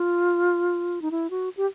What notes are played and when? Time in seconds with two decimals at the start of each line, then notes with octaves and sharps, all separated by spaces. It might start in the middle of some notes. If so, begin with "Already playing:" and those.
Already playing: F4
1.02 D#4
1.11 E4
1.30 F#4
1.57 G4